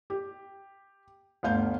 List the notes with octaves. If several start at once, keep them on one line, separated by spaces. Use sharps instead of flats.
G4
G1 D2 F5 G6